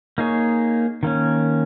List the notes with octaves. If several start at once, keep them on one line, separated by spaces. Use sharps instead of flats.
A#3 D#4 G#4 C#5
D#3 A#3 C#4